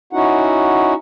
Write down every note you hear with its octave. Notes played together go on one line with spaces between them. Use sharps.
C#4 D#4 E4 F#4 F#5